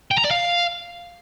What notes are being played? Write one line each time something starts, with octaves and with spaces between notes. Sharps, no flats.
G5
A#5
D5
F5